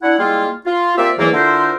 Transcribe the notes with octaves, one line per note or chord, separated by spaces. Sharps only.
D4 E4 F#5
G3 G#3 A#3 E4 F4
F4
A#3 C4 F4 G4 D5 E5
E2 G#2 E3 F#3 A3 A#3
D3 E4 F4 A4 A#4 C5